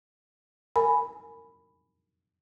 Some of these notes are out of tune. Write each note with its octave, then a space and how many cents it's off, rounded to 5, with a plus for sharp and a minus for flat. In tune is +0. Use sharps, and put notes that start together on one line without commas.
A#4 -20 G#5 +10 B5 +0